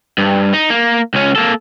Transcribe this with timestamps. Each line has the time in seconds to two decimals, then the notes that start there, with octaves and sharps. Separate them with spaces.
0.18 G2
0.53 D#4
0.70 A#3
1.14 C#2 C#4
1.36 A#3 A4